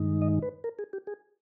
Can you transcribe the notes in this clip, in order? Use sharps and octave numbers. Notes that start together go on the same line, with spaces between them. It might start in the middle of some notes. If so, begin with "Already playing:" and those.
Already playing: G2 D#3 G#3 D#4
D#5
B4
A#4
G#4
G4
G#4